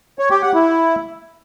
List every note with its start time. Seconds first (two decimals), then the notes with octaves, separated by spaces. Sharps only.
0.19 C#5
0.31 G4
0.42 F#5
0.54 E4